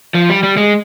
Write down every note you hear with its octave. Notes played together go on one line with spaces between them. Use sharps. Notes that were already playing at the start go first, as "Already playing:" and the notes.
F3
G3
G3
G#3